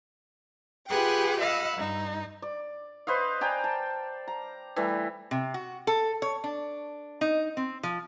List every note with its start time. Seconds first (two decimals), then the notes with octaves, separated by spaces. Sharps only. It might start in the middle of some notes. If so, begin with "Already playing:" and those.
0.87 F4 G4 G#4 B4 F#5 G5
1.40 D#5 F5 F#5 B5 E6
1.77 G2 D#4
2.42 D5
3.07 B4 C5 D#5 F5
3.41 D5 G5 G#5 A#5
3.64 A5
4.28 A#5
4.76 E3 G3 A3
5.31 C3
5.54 F#4
5.87 A4
6.22 C#5
6.44 D4
7.21 D#4
7.57 C4
7.83 F3